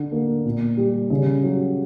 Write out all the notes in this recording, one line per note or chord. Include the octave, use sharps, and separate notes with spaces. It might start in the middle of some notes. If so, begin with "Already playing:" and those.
Already playing: D3
A#3
A#2
G3
C#3
F#3